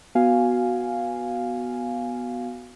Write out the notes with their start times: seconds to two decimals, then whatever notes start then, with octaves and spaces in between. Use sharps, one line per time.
0.15 B3 F#4 F5 G#5